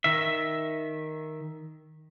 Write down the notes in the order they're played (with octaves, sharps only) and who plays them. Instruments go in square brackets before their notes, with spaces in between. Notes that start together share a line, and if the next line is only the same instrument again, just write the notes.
[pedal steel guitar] D#3 E5